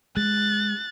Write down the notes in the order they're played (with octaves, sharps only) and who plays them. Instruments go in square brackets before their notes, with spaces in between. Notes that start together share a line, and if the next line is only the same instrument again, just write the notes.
[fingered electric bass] G#3 [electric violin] F#6 A6